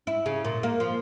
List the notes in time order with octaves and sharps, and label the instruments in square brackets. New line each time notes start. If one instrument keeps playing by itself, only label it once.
[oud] E4
C#3
A#2
A#3
F3